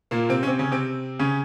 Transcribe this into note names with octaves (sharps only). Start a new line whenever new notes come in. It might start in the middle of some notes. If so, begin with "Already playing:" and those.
A#2 A#3
C3 C4
C#4
C3 C4
C#3 C#4
C3 C4
C#3 C#4